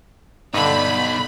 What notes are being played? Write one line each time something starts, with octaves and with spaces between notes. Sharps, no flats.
G2 B2 D3 D#4 B5